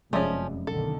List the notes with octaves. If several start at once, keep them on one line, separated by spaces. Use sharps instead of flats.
F1 F#2 F3 G#3 C#4 D5 E5
B1 D3 D#3 A4